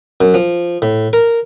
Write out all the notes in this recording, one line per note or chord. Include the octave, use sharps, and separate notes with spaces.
F#2
F3
A2
A#4